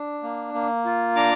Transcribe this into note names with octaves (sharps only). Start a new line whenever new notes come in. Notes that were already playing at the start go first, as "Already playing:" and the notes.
Already playing: D4
A#3
A#3
F4
D4 A#5 D6